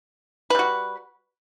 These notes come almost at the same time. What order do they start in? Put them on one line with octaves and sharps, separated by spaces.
B4 G3 F#4